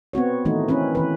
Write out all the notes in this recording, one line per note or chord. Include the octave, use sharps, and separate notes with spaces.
B3 C4 F#4 C#5
D#3 E3 A3 D#4 F#4
C4 C#4 E4 B4
D#3 E3 B4